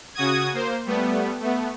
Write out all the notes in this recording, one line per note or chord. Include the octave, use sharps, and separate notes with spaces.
C#3 F#4 D#6 G#6
A#3 C5
G3 A3 B3
A3 B3